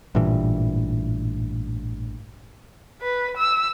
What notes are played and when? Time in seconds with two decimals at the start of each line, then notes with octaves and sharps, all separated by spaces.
0.15 A1 G2 A#2 E3
3.02 B4
3.36 E6